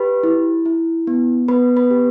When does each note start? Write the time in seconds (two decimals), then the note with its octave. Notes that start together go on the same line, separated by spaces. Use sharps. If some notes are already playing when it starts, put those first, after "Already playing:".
Already playing: G4 B4 B5
0.23 E4
0.66 E4
1.07 B3
1.48 B3 B4 B5
1.76 B4 B5
1.91 G4